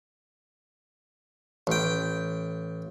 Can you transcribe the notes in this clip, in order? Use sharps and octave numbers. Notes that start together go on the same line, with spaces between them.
A1 G5